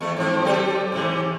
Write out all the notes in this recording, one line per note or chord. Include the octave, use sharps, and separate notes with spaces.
E2 A3
G#2 F3 C4
F#3 G4 A4
G#2 C3 E3